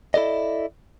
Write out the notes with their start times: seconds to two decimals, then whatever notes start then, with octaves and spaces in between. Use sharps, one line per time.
0.14 E4 A4 D5 D#5